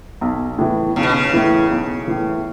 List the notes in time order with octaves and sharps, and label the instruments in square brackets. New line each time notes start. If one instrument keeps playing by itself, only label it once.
[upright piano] B1
A2 E3
[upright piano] B1 [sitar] C#3
[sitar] B2
C#3
[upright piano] A2 E3
B1
A2 E3